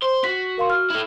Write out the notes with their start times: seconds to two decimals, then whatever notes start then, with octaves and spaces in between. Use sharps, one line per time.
0.02 C5 C6
0.24 F#4 B6
0.58 A#4 F5 C6
0.70 F6
0.91 E4 A4